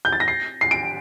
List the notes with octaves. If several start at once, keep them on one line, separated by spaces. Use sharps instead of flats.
G6
A6
A#6
C7
C7
D7